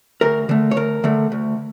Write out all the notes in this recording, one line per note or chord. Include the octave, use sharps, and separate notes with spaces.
D2 A#4
D3 A3
C#5
D2 A#4
D3 A3
D2